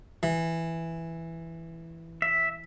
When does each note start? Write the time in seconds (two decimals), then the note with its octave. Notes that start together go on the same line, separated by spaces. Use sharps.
0.23 E3
2.22 E5